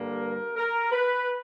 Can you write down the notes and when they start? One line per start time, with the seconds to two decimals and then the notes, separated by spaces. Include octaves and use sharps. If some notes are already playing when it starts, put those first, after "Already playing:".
Already playing: G2 D3 G3 A#3 A#4
0.56 A#4
0.92 B4